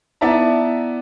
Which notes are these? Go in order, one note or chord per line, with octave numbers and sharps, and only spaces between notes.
B3 E4 D5 E5 A5 A#5